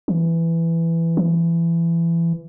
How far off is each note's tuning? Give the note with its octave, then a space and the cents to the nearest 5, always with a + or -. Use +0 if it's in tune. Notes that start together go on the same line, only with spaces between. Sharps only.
E3 +10
E3 +25